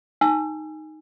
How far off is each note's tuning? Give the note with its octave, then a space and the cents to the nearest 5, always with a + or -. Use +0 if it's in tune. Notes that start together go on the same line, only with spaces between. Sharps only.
D#4 +0 G#5 -10 E6 +30